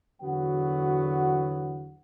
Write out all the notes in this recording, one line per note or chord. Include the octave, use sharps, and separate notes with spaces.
E2 D3 F#3 B3 F#4 F#5